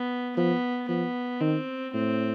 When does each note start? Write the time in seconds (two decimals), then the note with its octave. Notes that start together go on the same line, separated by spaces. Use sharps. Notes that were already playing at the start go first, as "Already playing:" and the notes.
Already playing: B3
0.37 F3 B3
0.88 F3 B3
1.40 D#3 C4
1.94 A2 C4